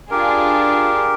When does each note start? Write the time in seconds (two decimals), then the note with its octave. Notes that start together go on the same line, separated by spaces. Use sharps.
0.11 D4 F4 G4 G#4 A#4